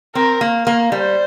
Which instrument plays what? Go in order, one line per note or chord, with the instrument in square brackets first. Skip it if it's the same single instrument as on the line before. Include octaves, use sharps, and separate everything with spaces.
[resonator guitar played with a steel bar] C4 [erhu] A#4
[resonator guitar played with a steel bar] A#3
A#3
[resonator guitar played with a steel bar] G3 [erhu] C5